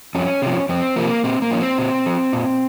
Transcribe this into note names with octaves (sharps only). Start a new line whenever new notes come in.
F2 C#4
C3 F3
F2 C4
C3 F3 A#3
A#2 C4
A#3
F3 C#4
C4
A#2
F3
A#2